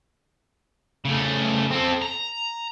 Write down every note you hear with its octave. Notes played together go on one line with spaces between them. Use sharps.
C#3 A3
C4 A4
A#5